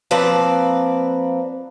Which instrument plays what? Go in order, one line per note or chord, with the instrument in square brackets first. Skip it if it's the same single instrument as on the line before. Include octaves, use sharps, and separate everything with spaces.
[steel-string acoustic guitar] F3 A#3 C4 B4 D5